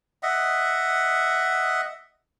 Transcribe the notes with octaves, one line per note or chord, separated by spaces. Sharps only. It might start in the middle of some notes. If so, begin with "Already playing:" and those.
D#5 E5 F#5